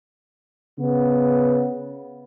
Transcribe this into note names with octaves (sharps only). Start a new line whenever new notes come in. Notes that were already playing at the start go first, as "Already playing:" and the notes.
C#3 B3